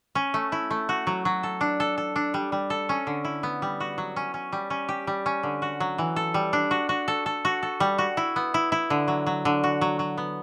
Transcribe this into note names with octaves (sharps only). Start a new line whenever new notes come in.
C#4
A3
E4
A3
F#4
F#3
F#3
A4
D4
A4
A4
D4
G3
G3
A4
C#4
D3
E4
B3
G3
F#4
F#3
C#4
C#4
G3
C#4
G4
G3
C#4
D3
F#4
F#3
E3
A4
G3
D4
F#4
F#4
A4
A4
F#4
A4
G3
F#4
E4
B3
E4
E4
D3
F#3
F#3
D3
F#4
F#3
F#3
B3